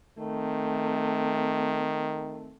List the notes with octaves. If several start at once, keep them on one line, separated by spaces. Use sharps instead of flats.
D#3 A3 C4